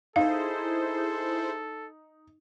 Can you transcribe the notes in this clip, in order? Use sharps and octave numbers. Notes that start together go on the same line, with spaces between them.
D#4 E4 G#4 A4 C5 F5